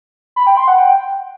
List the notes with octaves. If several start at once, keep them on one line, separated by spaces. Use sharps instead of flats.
B5
G5
C6
F#5
G5